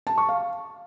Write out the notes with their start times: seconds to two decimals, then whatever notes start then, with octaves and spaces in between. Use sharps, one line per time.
0.07 A5
0.18 C#6
0.29 F5